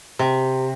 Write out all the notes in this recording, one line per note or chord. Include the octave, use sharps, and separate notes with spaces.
C3